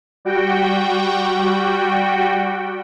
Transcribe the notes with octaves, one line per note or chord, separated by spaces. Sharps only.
G3 F#4 G5